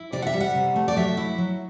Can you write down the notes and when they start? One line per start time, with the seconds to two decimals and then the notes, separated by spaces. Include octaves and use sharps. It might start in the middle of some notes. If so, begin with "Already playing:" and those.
Already playing: E4
0.13 C3 D5
0.22 F#5
0.27 E5
0.33 G3
0.41 F#5
0.55 C3
0.76 A3
0.88 D5
0.96 F#3 E5
1.17 E4
1.38 F#3